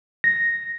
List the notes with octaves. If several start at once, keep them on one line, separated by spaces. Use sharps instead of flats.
A#6